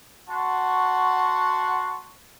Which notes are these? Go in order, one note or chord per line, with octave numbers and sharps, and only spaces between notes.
F#4 F#5 A5 C6 C#6